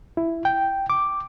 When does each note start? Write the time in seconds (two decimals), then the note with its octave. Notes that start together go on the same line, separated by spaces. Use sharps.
0.17 E4
0.45 G5
0.90 D6